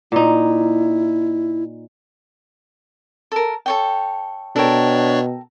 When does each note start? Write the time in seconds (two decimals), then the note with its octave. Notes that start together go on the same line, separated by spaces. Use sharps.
0.12 A#2 D#4 E4
3.32 A4 A#4
3.66 A4 C#5 G5
4.56 B2 D4 A4 A#4 C#5 G5